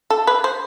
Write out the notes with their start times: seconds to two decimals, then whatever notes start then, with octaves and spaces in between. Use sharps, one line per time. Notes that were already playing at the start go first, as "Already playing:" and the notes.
0.10 A4
0.27 B4
0.44 C5